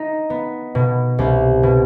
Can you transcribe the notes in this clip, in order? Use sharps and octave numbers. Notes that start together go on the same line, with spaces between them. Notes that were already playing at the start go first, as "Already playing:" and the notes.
Already playing: D#4
B3
B2
C2
B2